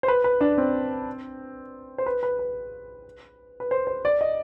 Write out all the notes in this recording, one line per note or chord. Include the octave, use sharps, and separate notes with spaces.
C5
B4
B4
D4
C4
C5
B4
B4
B4
B4
C5
C5
D5
D#5